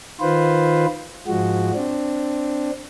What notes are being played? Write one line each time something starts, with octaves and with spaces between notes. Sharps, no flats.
D#3 F4 B4 C5
G#2 F3 G#3 F#4
C4 D4